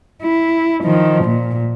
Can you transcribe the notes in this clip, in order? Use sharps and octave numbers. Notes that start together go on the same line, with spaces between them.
E4
D#3 F3
A#2